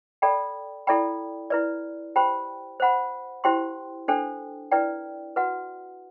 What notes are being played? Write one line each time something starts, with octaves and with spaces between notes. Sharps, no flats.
A4 D5 G5 B5
E4 A4 D5 G5 B5
E4 B4 D5
G4 C5 G5 B5
C5 F#5 B5
E4 G4 C5 G5 C6
D4 A4 C5 G5
E4 B4 D5 G5
F#4 B4 F#5